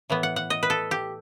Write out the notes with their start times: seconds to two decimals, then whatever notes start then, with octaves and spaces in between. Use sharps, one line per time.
0.10 A2 E3 B3
0.23 F#5
0.36 F#5
0.50 D#5
0.63 B4
0.70 A4
0.91 G4